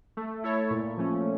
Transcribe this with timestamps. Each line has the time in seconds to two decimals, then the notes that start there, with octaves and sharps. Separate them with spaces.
0.17 A3
0.44 E4 A4 C#5
0.71 A#2
0.97 F3 A3 C#4